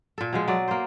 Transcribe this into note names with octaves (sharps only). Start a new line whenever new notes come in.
A#2 A4
B2 F3 G#3
F#3 D5
A#3 C5